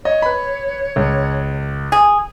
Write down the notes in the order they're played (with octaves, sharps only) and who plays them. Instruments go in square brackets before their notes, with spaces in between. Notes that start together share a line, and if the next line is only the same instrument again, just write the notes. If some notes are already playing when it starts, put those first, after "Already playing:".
[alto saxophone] C#5 [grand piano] D#5
[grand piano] B4 B5
C#2
[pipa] G#4